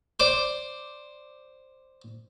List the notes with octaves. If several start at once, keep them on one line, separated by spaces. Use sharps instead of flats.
C5 D5